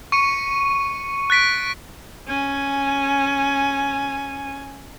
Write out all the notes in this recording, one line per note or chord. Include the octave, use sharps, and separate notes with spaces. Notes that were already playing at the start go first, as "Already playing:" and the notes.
C#6 C#7 D#7
F#6 A6 B6 D7
C#4 G#5